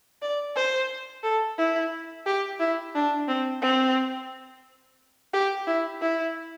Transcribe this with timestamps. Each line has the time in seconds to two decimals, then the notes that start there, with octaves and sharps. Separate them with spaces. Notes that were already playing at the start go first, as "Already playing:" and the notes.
0.22 D5
0.56 C5
1.23 A4
1.58 E4
2.26 G4
2.60 E4
2.95 D4
3.28 C4
3.62 C4
5.33 G4
5.67 E4
6.01 E4